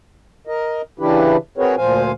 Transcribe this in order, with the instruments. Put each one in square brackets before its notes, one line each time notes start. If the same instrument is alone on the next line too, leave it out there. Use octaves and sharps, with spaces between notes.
[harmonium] A#4 D#5
C#3 E3 D4 E4 G4 B4
C4 F#4 G#4 A#4 B4 C#5
D2 A#2 F3 C5 F5 G#5